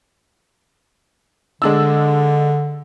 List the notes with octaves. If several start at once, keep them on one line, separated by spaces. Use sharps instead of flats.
D3 G#3 D4 E6